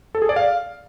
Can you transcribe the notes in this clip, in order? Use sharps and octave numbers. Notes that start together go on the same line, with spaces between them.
A4
G#4
D5
F5